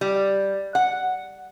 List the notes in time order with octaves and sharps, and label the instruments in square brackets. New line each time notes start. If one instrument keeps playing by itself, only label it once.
[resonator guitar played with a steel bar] G3
F#5